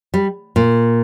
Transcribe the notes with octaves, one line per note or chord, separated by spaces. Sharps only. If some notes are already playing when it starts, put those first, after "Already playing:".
G3
A#2